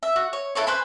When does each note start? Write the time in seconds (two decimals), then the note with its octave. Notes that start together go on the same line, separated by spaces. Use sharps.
0.03 E5
0.16 F#4
0.33 C#5
0.55 E4 A4 B4 C#5
0.67 B4 C5 G#5 B5